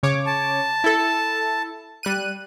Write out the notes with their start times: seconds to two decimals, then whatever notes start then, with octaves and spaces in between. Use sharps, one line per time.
0.03 C#3 C#5 D6
0.26 A5
0.84 E4 A4
2.03 G3 F#6 D#7